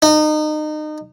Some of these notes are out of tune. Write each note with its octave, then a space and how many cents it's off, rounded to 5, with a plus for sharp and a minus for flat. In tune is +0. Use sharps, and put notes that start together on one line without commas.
D#4 -30